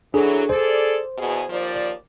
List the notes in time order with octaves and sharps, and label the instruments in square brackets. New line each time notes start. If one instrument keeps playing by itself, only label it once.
[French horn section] E3 F#3 [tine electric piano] D4 G#4 A4
[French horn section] G#4 A4 D5 [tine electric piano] C5
[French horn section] E2 B2 G#4
D#2 F3 D5